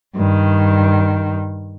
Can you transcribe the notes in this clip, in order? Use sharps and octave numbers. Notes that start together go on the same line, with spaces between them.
G2 D#3